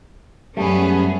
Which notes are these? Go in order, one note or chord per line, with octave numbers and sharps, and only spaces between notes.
F#2 G3 A3 B3 C#4 G#4